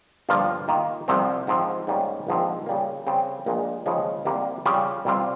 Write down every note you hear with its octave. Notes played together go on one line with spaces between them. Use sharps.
G1 G2 F3 A#3 F4
D#3 A#3 F4
C2 C3 F3 C4
G#2 F3 C4
G#2 G3 A#3 C#4
A#1 G#2 F3 C4
C#3 G3 A#3
C#3 G3 C4
A#1 A#2 G#3
D#2 C#3 F3 G#3
C2 C3 G3 A#3
C#3 G3 C#4 F4
C2 C3 G3 C4 F4